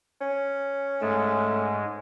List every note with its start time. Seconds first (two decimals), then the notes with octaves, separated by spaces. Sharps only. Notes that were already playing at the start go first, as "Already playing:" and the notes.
0.21 C#4
1.02 G#2 G#3 A3